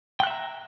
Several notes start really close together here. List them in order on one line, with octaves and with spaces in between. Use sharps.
G5 F#6 E5 A#5